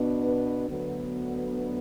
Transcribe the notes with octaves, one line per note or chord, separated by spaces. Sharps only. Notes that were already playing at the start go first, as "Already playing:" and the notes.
Already playing: B2 B3 D4
B4
D2 D3 F#3 B3